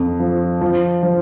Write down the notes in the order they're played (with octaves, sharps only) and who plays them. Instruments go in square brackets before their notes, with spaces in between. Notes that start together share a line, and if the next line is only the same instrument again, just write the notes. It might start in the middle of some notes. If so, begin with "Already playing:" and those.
Already playing: [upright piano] F2
F3
F3
F3